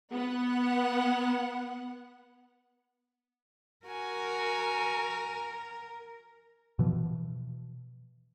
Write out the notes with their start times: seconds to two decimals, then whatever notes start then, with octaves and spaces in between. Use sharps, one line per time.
0.12 B3 F#5
3.86 F#4 A#4 G#5
6.79 B2 E3 F3